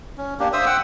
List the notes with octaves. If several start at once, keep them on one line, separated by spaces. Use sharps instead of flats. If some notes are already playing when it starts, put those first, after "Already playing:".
C#4
A#3 D4 G4
C5 E5 D#6 E6
F#5 G5 E6